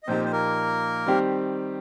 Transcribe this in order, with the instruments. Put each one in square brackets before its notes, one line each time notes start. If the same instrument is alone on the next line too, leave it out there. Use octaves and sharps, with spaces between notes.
[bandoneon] D#5
[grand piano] A#2 F3 D#4 G4 [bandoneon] C4 C5
[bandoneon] C5
A#3 A#4
[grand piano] D#3 G3 C4 G4